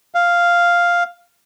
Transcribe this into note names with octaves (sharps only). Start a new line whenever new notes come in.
F5